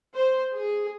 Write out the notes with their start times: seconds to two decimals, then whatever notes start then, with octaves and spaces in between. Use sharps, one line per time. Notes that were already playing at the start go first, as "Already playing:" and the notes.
0.14 C5
0.54 G#4